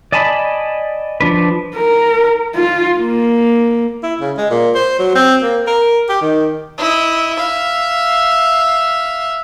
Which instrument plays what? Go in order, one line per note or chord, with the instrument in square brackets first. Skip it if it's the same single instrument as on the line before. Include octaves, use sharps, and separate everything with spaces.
[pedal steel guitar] D5 D#5 G#5 A5 B5
F3 D4 B4
[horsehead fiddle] A#4
F4
A#3
[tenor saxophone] E4
C#3
G#3
A#2
C5
F#3
C4
A#3
A#4
G4
D#3
[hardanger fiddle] E4 D#5
E5 F5